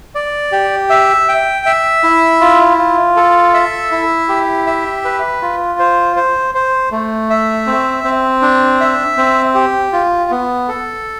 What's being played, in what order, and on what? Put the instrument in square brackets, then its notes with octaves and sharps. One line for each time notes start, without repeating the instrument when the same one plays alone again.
[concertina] D5
G4
E5
G5
E5
E4
F4
F4
A4
E5
E4
G4
E5
B4
F4
C5
C5
C5
A3
E5
C4
C4
D4
E5
C4
G4
F4
B3
A4